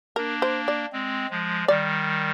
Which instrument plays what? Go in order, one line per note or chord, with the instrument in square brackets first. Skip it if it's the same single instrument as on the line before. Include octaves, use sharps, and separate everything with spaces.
[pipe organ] A#3 D4 [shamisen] A#4
[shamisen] C5
D5
[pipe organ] G#3 C4
F3 G#3
[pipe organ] D#3 G3 [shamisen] D5